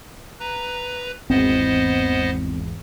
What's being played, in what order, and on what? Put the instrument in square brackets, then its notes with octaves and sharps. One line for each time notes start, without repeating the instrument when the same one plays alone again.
[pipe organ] B4 A#5
[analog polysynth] G#1 E2 [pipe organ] B3 C5 D#5 [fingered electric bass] C4